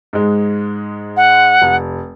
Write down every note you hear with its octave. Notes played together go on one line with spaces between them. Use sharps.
G#2 G#3
F#5
F1